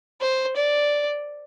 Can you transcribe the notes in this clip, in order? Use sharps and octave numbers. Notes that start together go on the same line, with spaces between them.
C5
D5